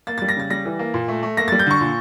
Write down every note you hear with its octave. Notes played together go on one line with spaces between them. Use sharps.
A#3 A6
G3 A6
A#6
C#3 A6
G3 A#6
E3
A#3
A#2
A3
A3
A#3 A#6
G3 A6
G6
D3 C#6
A#2